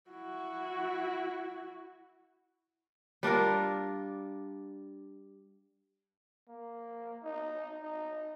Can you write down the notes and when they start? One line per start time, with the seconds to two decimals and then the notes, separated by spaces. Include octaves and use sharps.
0.10 E4 F#4
3.23 G3 D4 F4 A#4
6.49 A#3
7.23 D#4
7.83 D#4